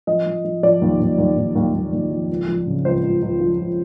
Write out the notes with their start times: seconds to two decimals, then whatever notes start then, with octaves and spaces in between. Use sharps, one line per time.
0.07 F3 D#5
0.26 F3
0.45 F3
0.63 F3 D5
0.82 D#2
1.00 D#2
1.18 D#2
1.37 D#2
1.55 D#2
1.74 D#2
1.92 D#2
2.11 F3
2.30 C#2
2.48 F3
2.67 C#3
2.85 C#2 C5
3.03 C#2
3.22 C#2
3.40 F3
3.59 C#2